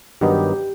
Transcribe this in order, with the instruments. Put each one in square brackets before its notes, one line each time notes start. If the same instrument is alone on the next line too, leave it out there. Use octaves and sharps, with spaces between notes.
[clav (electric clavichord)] G2 D#3 F#3 B3 D#4 [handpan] G4